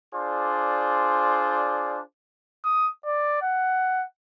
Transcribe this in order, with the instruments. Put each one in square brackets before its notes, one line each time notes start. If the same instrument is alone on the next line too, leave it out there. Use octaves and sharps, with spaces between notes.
[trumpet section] D4 F4 G#4 C5 D5
[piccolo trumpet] D#6
D5
F#5